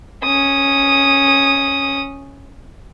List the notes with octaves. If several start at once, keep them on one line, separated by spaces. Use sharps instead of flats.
C#4 D#6